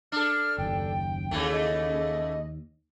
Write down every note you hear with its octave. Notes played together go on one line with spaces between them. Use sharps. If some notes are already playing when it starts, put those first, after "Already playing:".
D4 A4 F6
F#1 D#2 G5
D#2 C#3 E3 A3
D#5